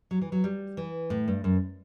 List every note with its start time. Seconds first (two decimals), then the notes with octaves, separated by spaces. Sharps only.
0.11 F#3
0.22 E3
0.32 F#3
0.44 G3
0.77 E3
1.10 A2
1.28 G2
1.44 F#2